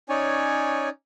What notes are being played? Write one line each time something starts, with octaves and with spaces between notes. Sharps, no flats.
C#4 D#4 C#5 D5 G#5